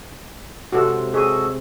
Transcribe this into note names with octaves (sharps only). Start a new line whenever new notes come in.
C3 G#3 C4 F#4 A4
F#4 G#4 A4 D#5